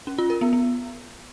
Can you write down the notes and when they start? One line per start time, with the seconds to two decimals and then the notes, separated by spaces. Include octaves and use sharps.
0.07 C#4
0.18 F4
0.30 A#4
0.41 B3
0.53 B3